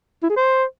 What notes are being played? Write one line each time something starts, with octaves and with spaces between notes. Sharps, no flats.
E4
G#4
C5